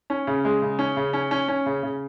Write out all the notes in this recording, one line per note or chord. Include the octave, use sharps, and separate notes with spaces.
C#4
C#3
G#3
C#3
C#4
C#3
C#4
C#4
C#4
C#3
C#3